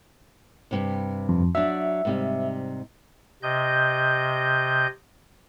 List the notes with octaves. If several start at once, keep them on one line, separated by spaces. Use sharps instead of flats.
G2 C3
F2
F#3 D4 E5
G#2 C3 G3
C3 D#5 G6